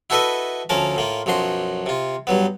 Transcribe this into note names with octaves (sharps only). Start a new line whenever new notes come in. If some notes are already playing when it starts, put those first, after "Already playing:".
E4 F#4 A4 B4 D#5 E5
D2 F3 C#4 A#4 A5
A2 A#3 F4
B1 F#2 F3 F#4 C6
C3 F4
G2 F#3 B3